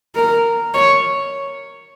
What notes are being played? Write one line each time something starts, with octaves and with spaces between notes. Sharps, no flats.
A#4
C#5